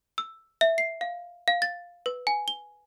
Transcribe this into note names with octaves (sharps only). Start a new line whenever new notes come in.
E6
E5
C7
F5
F5
A6
B4
G#5
G7